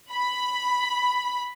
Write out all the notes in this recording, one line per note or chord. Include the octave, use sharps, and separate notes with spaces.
B5